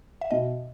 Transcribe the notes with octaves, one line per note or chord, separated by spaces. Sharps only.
E5
B2 D#5